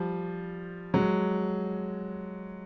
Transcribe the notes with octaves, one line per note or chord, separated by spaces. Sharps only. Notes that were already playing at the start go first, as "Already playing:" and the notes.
Already playing: F3 G3
F#3 G#3